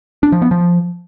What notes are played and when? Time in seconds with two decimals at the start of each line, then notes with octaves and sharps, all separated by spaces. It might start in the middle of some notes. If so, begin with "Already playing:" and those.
0.23 D4
0.32 F3
0.42 B3
0.51 F3